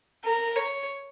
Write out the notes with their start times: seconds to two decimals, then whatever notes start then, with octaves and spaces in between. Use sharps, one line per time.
0.24 A#4
0.56 C#5